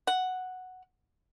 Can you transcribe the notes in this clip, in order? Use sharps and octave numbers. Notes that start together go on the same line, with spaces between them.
F#5